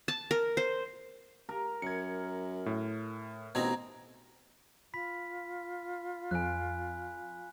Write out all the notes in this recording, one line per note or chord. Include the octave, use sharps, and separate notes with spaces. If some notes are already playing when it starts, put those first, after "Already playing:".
A5
A#4
C5
A#4
F#2 G#6 C#7
A2
A1 B2 C4 D#4 A#5 G#6
F4 B5 B6
F2 G#5 F#6